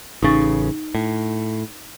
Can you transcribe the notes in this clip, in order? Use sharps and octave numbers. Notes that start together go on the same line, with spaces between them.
A1 C#3 D#4 C#6 A6
A2